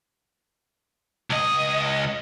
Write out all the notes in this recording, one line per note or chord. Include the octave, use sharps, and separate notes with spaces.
C#2 D#5